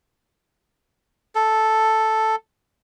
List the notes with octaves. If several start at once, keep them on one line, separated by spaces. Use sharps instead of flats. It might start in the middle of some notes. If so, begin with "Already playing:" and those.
A4